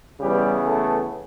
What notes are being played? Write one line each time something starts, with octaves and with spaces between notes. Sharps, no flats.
C#3 E3 G3 B3 G4
A3 A4